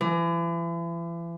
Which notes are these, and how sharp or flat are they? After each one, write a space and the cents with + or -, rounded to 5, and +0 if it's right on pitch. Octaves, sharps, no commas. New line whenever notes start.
E3 +40